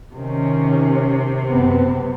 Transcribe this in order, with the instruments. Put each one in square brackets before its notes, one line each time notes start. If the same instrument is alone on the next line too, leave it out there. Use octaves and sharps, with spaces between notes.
[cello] C3 [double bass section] D#3 C#4
[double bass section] F#1 B3 C4